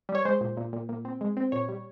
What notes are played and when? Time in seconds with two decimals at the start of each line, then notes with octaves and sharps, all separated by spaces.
0.09 G3
0.15 C#5
0.25 G#3 C5
0.41 A#2
0.57 A#2
0.73 A#2
0.89 A#2
1.05 C4
1.21 G#3
1.37 C4
1.52 A#2 C#5
1.69 G3